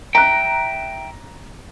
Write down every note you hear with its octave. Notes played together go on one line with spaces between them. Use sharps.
E5 G5 A#5 F#6